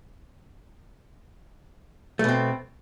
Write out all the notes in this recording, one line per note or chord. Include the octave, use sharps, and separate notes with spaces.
B2 A3 C4